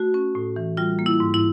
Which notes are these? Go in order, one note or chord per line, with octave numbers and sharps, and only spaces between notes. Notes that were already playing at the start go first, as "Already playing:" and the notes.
Already playing: A3 F#4
C#4
A2
E3
G3 F4
A#3
E4
G#2
E4